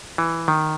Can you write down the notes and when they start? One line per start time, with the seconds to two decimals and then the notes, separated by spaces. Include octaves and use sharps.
0.18 E3
0.48 D#3